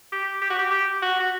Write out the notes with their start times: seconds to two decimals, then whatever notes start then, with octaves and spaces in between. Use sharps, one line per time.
0.13 G4
0.42 G4
0.50 F#4
0.59 G4
0.71 G4
1.02 F#4
1.20 F#4